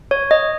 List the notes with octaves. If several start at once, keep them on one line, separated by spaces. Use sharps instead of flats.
C#5
D#5